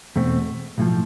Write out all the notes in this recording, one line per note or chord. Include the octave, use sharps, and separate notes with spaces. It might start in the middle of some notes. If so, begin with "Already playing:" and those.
E2 B2 A3 C4
B1 A2 F3